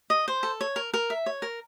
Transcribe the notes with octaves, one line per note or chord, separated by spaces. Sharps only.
D#5
C5
A4
C#5
A#4
A#4
E5
C#5
A#4